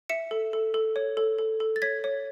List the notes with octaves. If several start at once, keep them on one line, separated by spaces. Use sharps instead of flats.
E5 C#7 E7
A4
A4
A4
C#5
A4
A4
A4
A6
C#5 G#6 B6
C#5